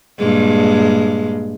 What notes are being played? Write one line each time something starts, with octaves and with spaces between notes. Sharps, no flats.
G2 A#2 G#3